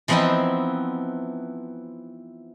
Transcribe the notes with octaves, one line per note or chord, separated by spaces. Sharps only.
E3 F3 B3 C4 D#4 E4